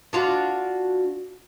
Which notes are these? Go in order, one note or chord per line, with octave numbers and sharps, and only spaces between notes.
D4 F4 F#4